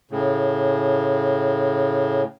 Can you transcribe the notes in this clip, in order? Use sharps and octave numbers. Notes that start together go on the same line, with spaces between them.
A2 C#3